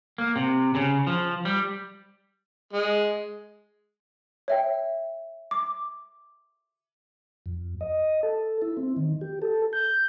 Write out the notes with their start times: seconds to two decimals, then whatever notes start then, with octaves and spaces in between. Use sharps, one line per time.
0.18 A#3
0.36 C3
0.75 C#3
1.07 F3
1.45 G3
2.73 G#3
4.48 C#5 E5 G5
5.51 D6
7.46 F2
7.81 D#5
8.23 A4
8.62 E4
8.77 C4
8.96 D#3
9.21 G4
9.42 A4
9.73 G6